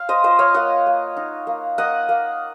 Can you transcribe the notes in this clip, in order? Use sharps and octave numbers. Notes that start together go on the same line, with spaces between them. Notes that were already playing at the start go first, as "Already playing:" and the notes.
Already playing: F5
C5 D#5
F4 C5 D#5
C#5 F5
A#3 D#5 F#5
A#3
D#4
A#3
A#3 D#5 F#5
A#3